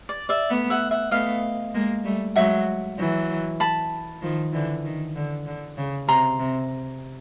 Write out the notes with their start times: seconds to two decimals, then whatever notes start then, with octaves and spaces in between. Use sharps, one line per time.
0.09 D5
0.29 D5 E5
0.49 A3 B3
0.70 E5 F#5
0.91 E5 F#5
1.11 A3 B3 D#5 F5
1.74 G#3 A#3
2.04 G3 A3
2.36 F#3 G#3 E5 F#5
2.98 E3 F#3
3.60 A5 B5
4.22 D#3 F3
4.53 D3 E3
4.85 D#3
5.16 D3
5.47 D3
5.77 C#3
6.08 C3 A#5 C6
6.39 C3